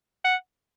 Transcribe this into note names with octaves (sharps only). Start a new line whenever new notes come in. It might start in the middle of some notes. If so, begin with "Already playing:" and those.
F#5